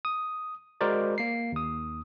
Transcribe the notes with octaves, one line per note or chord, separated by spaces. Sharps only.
D#6
G#3 F#4 A#4 C5 D5
A#3 C7
D#2 D#6